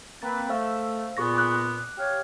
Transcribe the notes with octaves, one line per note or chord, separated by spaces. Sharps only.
A#3 C4 B4 A6
A3 C5 F5 E6
A#2 B3 G#4 C#6 A#6
D6 F#6
G4 C#5 F5